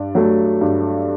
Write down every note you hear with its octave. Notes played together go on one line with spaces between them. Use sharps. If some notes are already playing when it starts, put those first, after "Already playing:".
Already playing: G2 D5
F#3 A3
G2